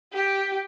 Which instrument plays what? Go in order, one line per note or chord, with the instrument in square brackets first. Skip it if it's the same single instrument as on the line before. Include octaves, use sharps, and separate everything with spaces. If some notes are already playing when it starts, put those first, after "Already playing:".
[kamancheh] G4